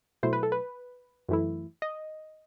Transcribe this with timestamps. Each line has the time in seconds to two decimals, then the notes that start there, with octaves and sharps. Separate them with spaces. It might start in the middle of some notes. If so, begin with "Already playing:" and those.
0.23 B2 F#3 A3 E4 C5
0.33 B4
0.43 A4
0.52 B4
1.29 F#2 E3 A3 E4
1.82 D#5